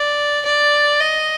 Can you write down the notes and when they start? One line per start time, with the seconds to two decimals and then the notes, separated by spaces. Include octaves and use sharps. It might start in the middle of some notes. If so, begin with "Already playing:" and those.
Already playing: D5
0.45 D5
1.01 D#5